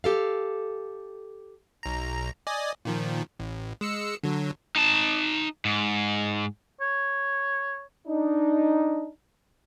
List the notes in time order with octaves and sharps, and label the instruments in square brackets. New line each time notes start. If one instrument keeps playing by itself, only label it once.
[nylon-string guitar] G4 A4 F5
[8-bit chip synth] B1 A#5
D5 D#5 G#5
A#2 D#3 F3
A1
G#3 E6 C#7
D3 F#3
[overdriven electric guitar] D#4 A5
G#2
[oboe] C#5
[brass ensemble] D4 D#4